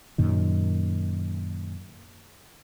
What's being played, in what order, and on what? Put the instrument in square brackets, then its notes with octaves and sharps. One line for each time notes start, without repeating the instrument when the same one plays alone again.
[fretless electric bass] F#2 A#2 D#3